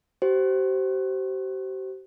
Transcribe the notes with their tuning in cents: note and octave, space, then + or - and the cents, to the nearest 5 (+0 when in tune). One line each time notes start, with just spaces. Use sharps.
G4 -40 C5 +0